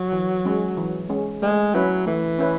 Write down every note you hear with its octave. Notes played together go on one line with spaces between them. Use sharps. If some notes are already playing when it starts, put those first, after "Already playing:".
Already playing: F#3
E3
G#3 C#4
E3
G#3 C#4
G#3 A3
F#3 C#4 E4 B4
E3 A3
C#4 E4 B4